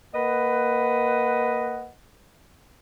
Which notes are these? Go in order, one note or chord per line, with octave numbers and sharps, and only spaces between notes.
A#3 B4 D#5 F#5